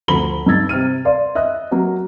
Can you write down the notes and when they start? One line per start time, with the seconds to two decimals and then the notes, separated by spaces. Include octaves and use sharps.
0.08 D2 F3 A#5 B5 G7
0.46 G2 D#4 E6 G#6 A6
0.69 C3 C4 F6 D#7
1.05 D5 F5 C6
1.35 D#5 E5 F#6
1.71 F#3 A#3